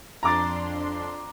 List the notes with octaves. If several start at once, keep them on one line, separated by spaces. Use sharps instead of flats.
F2 D4 A#5 C6 D6 A6